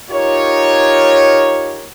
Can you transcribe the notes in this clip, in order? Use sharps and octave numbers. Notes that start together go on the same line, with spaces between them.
D#4 F4 G4 A#4 C#5